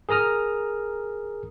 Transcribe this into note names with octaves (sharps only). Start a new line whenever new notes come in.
G#4 A#4 A#5 D#6 F6